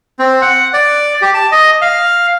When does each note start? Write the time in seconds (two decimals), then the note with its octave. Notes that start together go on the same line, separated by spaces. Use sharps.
0.19 C4
0.42 F#5
0.73 D5
1.22 G4
1.34 A5
1.52 D#5
1.81 F5